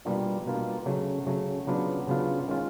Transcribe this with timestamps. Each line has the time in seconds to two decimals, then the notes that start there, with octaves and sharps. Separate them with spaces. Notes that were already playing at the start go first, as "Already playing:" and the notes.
0.05 B2 G3 A#3 D4 F4
0.46 B2 G3 A#3 D4 F4
0.86 C#3 F#3 A3
1.26 C#3 F#3 A3
1.67 C#3 F#3 B3 D4 F4
2.07 C#3 F#3 B3 D4 F4
2.48 D#3 G#3 C#4 F4